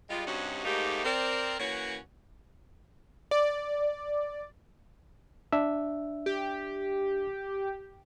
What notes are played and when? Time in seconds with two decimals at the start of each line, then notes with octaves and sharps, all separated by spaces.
0.09 G3 G#3 F4
0.26 G2 C3 C#4 D#4 F#4
0.64 G#2 A3 A#3 D#4 G4
1.04 C4 A#4 D5
1.59 E3 A#3 C#4 F#4 B4 C#5
3.31 D5
5.52 D4 E5
6.26 G4